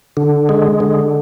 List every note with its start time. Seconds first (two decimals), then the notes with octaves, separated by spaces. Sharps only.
0.17 D3
0.49 G#3
0.80 D3